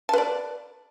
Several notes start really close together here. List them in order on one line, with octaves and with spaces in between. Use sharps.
A5 B4 D5